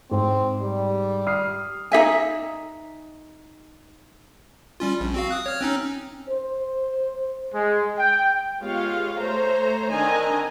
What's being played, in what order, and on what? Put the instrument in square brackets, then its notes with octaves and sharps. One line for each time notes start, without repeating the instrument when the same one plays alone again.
[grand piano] G#2 [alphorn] C4
[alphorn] G3
[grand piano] D#6 F6 C7
[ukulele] D#4 G#4 E5 G#5
[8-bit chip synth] G3 C#4 F4
A#1
C4 F#4 F5
D#6 F#6
C#5 F6
C4 C#4 D#4
[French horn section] C5
[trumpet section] G#3
G5
[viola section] G#3 B3 F4 G4 C#5 F5
A3 C5 C#5 A#5
D#3 C4 D4 D#5 G#5 A#5